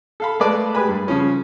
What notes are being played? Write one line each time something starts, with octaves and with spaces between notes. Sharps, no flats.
A4 F5 B5
G#3 A3 B4 D5 A5
G4 G#4 B4 G#5 B5
G2
C#3 F3 C#4